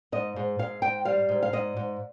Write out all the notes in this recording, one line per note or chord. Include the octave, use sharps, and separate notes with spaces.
G#2 D#5
G#2
G#2 F5
G#2 G5
G3 F5
G#2
F5
G#2 D#5
G#2